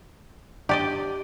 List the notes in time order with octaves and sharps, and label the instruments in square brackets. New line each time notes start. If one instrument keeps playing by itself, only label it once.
[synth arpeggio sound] D4 [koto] G4 D5 D#5